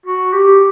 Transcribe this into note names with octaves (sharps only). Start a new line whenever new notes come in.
F#4
G4